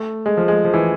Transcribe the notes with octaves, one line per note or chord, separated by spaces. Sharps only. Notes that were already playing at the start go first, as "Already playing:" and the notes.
Already playing: A3
G#3
F3
G#3
F3
E3